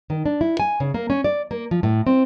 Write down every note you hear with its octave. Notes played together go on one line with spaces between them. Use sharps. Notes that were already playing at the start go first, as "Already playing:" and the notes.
D#3
D4
E4
G#5
C#3
A#3
C#4
D5
A#3
F3
A2
C4